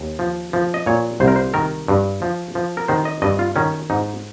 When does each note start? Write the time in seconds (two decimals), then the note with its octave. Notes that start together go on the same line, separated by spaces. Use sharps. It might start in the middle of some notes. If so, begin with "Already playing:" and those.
Already playing: D#2
0.19 F3
0.53 F3
0.74 D#5
0.86 A#2 C#5
1.20 C2 C5
1.28 A#4
1.36 C5
1.54 D#3 A#4
1.88 G2
2.22 F3
2.55 F3
2.77 A#4
2.88 D#3 C5
3.05 D#5
3.22 G2 D#5
3.39 F4
3.56 D#3 C#4
3.90 G#2 D#4